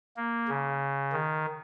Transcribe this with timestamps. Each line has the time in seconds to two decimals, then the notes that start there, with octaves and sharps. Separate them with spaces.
0.17 A#3
0.48 C#3
1.12 D#3